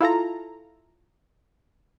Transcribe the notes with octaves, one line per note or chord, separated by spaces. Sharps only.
E4 F4 A4 A#5